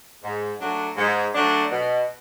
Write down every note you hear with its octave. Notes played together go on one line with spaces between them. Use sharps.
G#2
F#3 A3 D4
G#2
F#3 A3 D4
B2